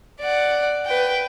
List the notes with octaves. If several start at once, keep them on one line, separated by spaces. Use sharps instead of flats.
D5 F#5
B4 G5